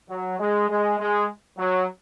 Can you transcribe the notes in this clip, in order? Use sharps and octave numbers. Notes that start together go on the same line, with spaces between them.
F#3
G#3
G#3
G#3
F#3